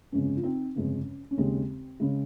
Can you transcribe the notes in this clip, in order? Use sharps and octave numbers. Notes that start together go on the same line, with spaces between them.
G1 F2 C#3 G#3 C#4
F4
C4 D#4
G1 F2 C#3 G#3 C#4
C#4
D#2 C#3 G#3 C4
C#3 G#3